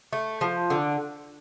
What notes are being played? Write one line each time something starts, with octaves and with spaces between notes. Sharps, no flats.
A3
F3
D3